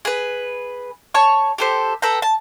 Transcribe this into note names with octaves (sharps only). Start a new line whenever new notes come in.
G#4 B4
C#5 A5 C#6
G4 A4 C5
A4 B4 G5 A#5
A5